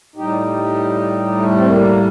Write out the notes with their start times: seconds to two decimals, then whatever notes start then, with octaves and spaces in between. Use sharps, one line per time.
0.16 A2 G3 D#4 G4
1.37 A3
1.55 C4
1.66 A#3